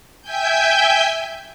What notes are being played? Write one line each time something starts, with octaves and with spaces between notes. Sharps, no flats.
E5 G5 G#5 G6